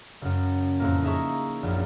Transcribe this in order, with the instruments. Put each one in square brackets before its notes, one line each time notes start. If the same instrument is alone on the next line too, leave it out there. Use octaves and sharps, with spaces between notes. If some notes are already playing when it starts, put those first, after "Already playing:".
[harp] F#1 F#2
F2 A2 A#3
D#4 G#4 E5 A#5 C#6
A#1 F#2